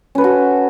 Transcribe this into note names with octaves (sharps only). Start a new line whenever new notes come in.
C#4 F#4 A4 B4